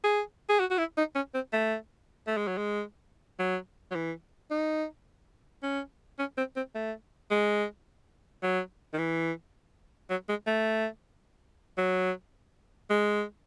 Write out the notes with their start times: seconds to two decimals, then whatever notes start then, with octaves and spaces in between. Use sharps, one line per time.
0.04 G#4
0.49 G#4
0.60 F#4
0.71 F#4
0.78 E4
0.98 D#4
1.15 C#4
1.34 C4
1.53 A3
2.27 A3
2.37 G#3
2.47 F#3
2.57 G#3
3.39 F#3
3.91 F#3
3.95 E3
4.51 D#4
5.63 C#4
6.19 C#4
6.37 C4
6.56 C4
6.75 A3
7.31 G#3
8.43 F#3
8.93 D#3
8.98 E3
10.10 F#3
10.29 G#3
10.47 A3
11.78 F#3
12.90 G#3